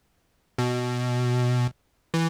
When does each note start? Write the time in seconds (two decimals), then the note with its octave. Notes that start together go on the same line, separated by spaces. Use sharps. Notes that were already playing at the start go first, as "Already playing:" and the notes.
0.58 B2
2.14 E3